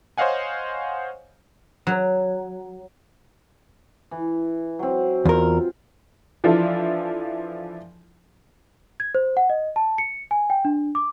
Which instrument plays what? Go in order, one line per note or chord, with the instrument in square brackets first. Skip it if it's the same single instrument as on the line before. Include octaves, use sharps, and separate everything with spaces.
[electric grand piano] C5 C#5 D#5 F5 F#5 G#5
[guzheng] F#3
[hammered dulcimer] E3
F#3 C4
[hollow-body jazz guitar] E2 A#4 [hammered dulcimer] F4
[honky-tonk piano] E3 F3 D4 E4 F4 A4
[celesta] G#6
C5
F#5
D#5
A5
C#7
G#5
G5
D4
D6